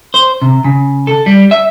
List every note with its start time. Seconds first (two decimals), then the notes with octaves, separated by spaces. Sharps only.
0.14 C5
0.42 C3
0.64 C#3
1.07 A4
1.26 G3
1.51 E5